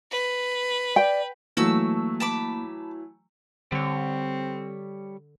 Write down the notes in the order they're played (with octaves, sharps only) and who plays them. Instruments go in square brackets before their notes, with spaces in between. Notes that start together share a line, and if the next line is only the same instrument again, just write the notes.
[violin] B4
[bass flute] D5 [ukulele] G5
[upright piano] E3 F#3 A3 [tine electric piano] A#3 [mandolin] F#4 A5 E6
[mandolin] A5 B5 D6
[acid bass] D3 [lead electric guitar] G3 C#5 [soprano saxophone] C4